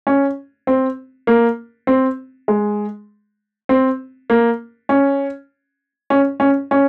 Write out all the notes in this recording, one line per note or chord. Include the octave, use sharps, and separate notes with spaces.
C#4
C4
A#3
C4
G#3
C4
A#3
C#4
C#4
C#4
C#4